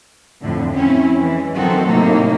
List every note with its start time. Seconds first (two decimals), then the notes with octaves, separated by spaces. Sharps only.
0.41 F2 A2 D3
0.73 C4 C#4 E4
1.19 E3 G#3
1.55 D#3 F3 F#3 C4 F#4 A4
1.87 A2 C3 A#3 D#4